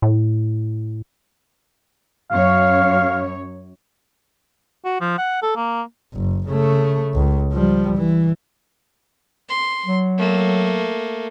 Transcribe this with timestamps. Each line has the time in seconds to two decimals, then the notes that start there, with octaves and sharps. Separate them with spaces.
0.02 A2
2.31 F#2 C#5 F5
4.85 F#4
5.01 F3
5.18 F#5
5.42 A4
5.56 A#3
6.14 F#1
6.49 C#3 A3
7.14 C#2
7.53 F3 G3
7.96 E3
9.49 C6
9.86 F#3
10.18 A3 A#3